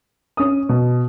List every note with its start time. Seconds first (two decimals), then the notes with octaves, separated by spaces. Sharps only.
0.37 C#4 D#6
0.69 B2